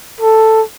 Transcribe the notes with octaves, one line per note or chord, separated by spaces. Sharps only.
A4